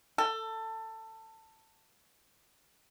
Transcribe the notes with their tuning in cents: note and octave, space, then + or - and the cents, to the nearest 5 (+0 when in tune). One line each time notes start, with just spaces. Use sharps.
A4 +20